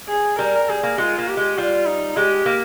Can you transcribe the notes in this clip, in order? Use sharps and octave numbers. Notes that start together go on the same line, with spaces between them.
G#4
G3 A#4
G3 G#4
A#3
G#3 F4
A#3
G4
G#3
G3 F4
D#4
G#3 G4
A#3